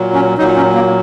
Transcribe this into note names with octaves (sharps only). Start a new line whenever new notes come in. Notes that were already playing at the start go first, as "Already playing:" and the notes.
Already playing: A#2 F#3
C#4
A#2 F#3 D#4
C#4
A#3